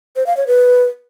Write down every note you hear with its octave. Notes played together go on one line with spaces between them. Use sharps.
C5
F5
C#5
B4